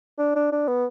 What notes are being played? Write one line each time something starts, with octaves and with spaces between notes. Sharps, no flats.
D4
D4
D4
B3